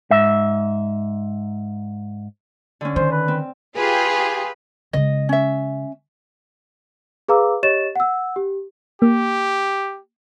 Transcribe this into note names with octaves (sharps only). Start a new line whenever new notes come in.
G#2 E5
D3 C#4
D#3 C5
B4
C4
F4 G4 G#4 B4
C#3 G#3 D#5
C#4 E5
G#4 B4 F5 A#5 D6 E6
G4 C#5 D#5 C#6 A6 E7
F#5 E6
G4
A#3 G4